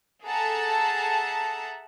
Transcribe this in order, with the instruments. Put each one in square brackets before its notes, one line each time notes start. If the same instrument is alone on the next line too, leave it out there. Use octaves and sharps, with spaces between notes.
[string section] G#4 A4 E5 F#5 A5 A#5